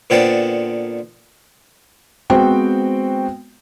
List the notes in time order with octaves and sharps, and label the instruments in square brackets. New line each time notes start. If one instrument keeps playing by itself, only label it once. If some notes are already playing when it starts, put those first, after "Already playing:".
[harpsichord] A#2 D3 B3 C5 G5 A5
[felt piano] G#3 B3 C4 F#4 C5 G5